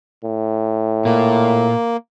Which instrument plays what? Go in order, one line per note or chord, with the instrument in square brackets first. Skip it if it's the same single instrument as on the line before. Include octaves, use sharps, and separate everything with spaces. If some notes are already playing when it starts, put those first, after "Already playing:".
[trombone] A2
[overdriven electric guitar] A#2 [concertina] A#3